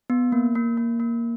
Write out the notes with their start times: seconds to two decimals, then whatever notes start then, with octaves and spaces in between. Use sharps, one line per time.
0.10 B3
0.32 A#3
0.55 A#3
0.77 A#3
1.00 A#3